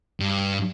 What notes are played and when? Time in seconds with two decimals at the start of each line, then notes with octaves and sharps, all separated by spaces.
0.20 G2